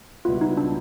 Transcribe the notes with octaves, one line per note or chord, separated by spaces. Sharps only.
C#2 B2 G3 B3 E4 F4
D#4
D4